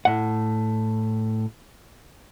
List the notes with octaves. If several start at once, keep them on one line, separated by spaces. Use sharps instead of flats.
A2 F#5